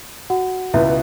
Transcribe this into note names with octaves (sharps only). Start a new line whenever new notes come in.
F#4 F#5
C#2 B2 B3 E4 E5